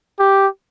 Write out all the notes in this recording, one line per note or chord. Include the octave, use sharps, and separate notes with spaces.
G4